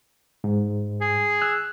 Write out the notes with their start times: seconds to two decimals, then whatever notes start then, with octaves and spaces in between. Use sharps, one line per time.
0.44 G#2
1.01 G#4
1.42 E6 F#6